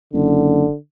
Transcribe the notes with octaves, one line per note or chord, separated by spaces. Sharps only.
F#1 D3